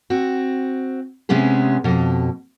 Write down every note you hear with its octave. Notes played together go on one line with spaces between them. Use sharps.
C4 F#4
C3 G#3 B3 C#4 G#4
F2 B2